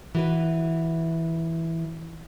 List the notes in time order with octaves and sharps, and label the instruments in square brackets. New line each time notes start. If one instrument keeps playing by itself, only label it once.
[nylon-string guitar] E3 F#4 B4